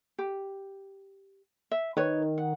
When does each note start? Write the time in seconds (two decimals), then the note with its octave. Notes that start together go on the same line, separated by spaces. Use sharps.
0.19 G4
1.71 E5
1.97 D#3 B4 C#5
2.38 F#5